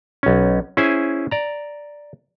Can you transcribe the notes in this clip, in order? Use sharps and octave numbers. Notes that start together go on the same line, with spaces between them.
B1 C#4
C#4 E4 G#4 C5 G#5
D5 A#5